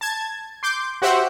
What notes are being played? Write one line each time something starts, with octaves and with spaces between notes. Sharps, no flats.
A5 G#6
C6 D6 G6
F#4 G4 C5 E5 F#5